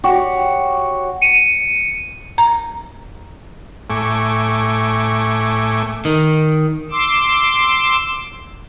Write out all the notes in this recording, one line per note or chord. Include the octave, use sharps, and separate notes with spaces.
F#4 G4 C#5 D6
C#7 D#7
A#5
A2 A3 G#5 C#6 D6
D#3
C6 D6 E6